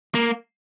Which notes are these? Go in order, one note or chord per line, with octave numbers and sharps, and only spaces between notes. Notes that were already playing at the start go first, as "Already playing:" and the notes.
A#3